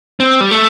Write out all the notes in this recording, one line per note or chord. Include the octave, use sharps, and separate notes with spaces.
C4
G3
A3